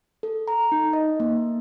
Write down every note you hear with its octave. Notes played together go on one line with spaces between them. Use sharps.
A4
A#5
D#4
D#5
A#3